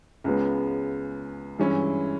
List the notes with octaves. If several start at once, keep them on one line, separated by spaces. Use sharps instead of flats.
C#2 C#3 G#3 B3
G2 E3 G#3 C#4 E4